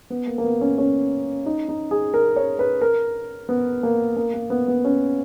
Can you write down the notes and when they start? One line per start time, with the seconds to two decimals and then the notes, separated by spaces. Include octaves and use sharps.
0.10 B3
0.27 A#3
0.38 A#3
0.44 B3
0.61 C#4
0.78 C#4
1.46 D#4
1.69 D#4
1.91 G#4
2.14 A#4
2.36 C#5
2.59 B4
2.82 A#4
3.49 B3
3.83 A#3
4.17 A#3
4.34 A#3
4.50 B3
4.68 B3
4.85 C#4